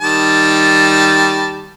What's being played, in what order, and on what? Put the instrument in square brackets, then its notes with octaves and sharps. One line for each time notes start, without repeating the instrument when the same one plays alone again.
[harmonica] D#3 G3 A5